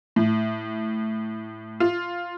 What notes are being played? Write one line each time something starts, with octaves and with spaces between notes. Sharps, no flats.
A2
F4